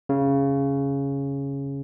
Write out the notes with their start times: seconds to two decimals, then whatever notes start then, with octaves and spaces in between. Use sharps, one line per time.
0.09 C#3